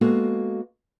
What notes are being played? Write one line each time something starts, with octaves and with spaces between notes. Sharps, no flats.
G#3 A#3 B3 F#4 A4